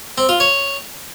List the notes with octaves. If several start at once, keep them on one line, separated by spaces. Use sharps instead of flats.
C4
F4
C#5